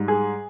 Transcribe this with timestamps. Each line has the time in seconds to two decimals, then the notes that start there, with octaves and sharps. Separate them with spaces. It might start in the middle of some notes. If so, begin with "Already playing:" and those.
Already playing: G#2 G3
0.08 G#4